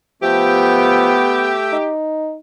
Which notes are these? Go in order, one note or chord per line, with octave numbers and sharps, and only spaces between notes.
F3 A3 B3 G4 E5 G5
D#4